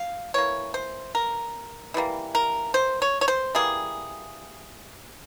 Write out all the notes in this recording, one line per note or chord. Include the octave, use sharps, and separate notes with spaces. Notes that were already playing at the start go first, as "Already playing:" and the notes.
Already playing: F5
E3 A#3 C#5
C5
A#4
E3 G3 A#3
A#4
C5
C#5
C#5
C5
E3 G3 A#3 G#4